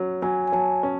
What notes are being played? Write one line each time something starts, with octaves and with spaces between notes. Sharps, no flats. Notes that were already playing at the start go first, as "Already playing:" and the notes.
Already playing: F#3 C#4
F#3 G#5
G#5
F#3 A5
C#4